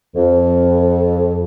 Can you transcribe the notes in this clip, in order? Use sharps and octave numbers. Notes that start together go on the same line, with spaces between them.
F2